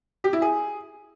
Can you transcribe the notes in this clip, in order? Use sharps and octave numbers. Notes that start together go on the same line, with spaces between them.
G4
E4
G#4